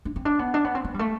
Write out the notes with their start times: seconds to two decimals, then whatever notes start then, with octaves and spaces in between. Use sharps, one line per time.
0.05 D4
0.16 C4
0.25 D4
0.39 B3
0.54 D4
0.65 B3
0.75 C4
0.85 B3
0.94 G3
0.99 A3